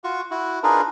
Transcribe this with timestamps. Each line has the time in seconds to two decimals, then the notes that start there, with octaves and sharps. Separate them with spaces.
0.04 F4 F#4 C#6
0.31 E4 F#4
0.63 D4 D#4 F4 G#4 A#4 B4